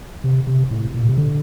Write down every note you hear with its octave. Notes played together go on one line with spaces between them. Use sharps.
C3
C3
A2
A#2
C3
D3